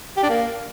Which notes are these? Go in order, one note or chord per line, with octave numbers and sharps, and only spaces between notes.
G4
D4
A#3